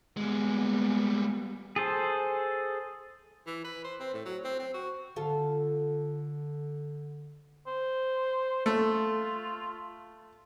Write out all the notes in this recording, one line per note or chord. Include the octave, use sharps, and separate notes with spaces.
G3 G#3 A#3 B3
G#4 A4 C5
E3
B4
C5
C4
A2
F#3
C4
C4
F#4
D3 F4 A4
C5
A3 F4